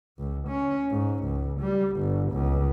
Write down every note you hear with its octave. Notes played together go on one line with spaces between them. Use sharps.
C#2
C#4
G#2
C#2
G3
G1
C#2